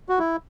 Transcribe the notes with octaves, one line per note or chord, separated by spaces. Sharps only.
F#4
E4